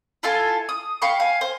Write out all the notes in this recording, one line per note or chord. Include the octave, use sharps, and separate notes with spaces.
E4 F4 A4 G#5
D#6
F5 G5 B5 C#6
F5 G#5
C5